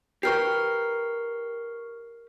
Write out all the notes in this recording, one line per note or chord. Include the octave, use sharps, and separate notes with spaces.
G4 A#4 B4 C#6 F6 C7